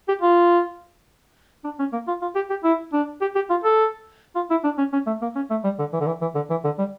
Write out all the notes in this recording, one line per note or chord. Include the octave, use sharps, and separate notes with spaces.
G4
F4
D4
C#4
A#3
F4
F4
G4
G4
E4
D4
G4
G4
F4
A4
F4
E4
D4
C#4
C#4
A3
A#3
C#4
A3
G3
D3
E3
D3
E3
E3
D3
E3
D3
G3